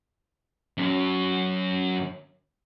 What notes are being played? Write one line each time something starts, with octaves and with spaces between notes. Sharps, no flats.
F#2 F#3